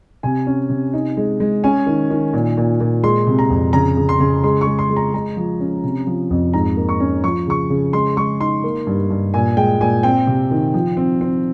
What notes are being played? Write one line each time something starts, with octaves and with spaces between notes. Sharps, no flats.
C3 G#5
C#4
C3
D#4
G#3
G#3
C#4 G#5
D#3
D#3
A#2
A#2
A#2
G#3 C6
C3
A#5
F2
C#3 A#5
C#3
C6
C#3
G#3 C6
C#6
G#3
C6
G#3
A#5
G#3 A#5
F3
C#4
C3
F3
F2
G#2 A#5
A#3
C#6
C#4
F3 C#6
C#3 C#6
C#3
G#3 C6
G#3 C#6
D#4 C6
A#3
G2
G2
A#2 G#5
G#3 G5
A#2 G#5
C4 G5
C3
D#3
F3
C4
C4